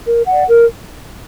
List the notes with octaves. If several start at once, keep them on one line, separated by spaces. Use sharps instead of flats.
A#4
D5 F#5
A#4